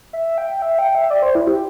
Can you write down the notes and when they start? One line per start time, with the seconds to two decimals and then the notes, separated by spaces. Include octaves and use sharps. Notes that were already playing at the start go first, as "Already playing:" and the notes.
0.13 E5
0.38 G5
0.62 E5
0.79 G5
0.95 E5
1.10 D5
1.22 C5
1.35 E4
1.47 G4